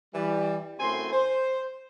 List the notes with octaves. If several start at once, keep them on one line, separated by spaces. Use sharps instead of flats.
E3 G3
F#2 A2 C4 G#5 C6
C5